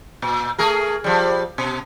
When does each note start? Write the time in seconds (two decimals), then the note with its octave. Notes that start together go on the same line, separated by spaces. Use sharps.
0.22 A#2
0.59 A3 G#4 A#4
1.04 F3 G3
1.58 B2